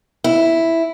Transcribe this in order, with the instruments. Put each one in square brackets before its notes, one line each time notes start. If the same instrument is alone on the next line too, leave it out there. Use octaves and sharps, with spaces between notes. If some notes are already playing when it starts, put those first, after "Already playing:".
[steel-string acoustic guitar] E4